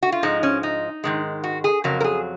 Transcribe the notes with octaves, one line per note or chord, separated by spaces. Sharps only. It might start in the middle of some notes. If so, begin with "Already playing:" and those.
F#4
F4
G#2 F3 G#3 D#4
C#4
D#4
G#2 D#3 G#3
F#4
G#4
F2 C#3 F#3 A#4
A#4
G#4